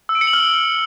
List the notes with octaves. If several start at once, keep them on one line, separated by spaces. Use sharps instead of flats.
E6
D7
C#7
F#7
F6